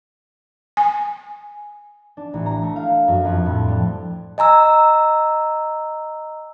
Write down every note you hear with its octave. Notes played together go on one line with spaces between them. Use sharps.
G#5
D4
A1
A#5
A3
F5
F#2
F2
A2
G3
D#5 G#5 A#5 E6